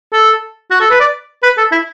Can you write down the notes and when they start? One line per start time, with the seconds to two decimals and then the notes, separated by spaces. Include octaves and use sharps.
0.13 A4
0.71 F#4
0.81 A4
0.90 B4
1.00 D5
1.43 B4
1.57 A4
1.72 E4